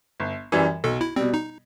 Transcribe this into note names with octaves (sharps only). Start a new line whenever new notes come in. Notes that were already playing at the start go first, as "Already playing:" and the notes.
G1
F#2 E3 G3
B1 A4
E4
B2 G3 C4
D#4